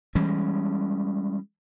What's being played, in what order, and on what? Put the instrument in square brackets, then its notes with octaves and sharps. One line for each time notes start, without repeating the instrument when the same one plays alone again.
[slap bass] E3 G3 G#3 C#4